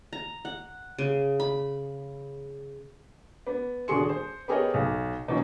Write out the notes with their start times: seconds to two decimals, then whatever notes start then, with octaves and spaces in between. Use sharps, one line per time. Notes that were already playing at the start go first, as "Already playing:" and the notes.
0.13 A#5
0.45 F#5
0.99 C#3
1.40 B5
3.47 B3
3.88 D#1 D4 F#4 G#4 C6 C#7
4.09 C5
4.48 B3 G4 G#4 A#4 C#5 D#5
4.74 B1
5.28 B2 E3 F#3 C#4